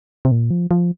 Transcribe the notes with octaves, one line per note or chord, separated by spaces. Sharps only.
C3
A#2
F3
F3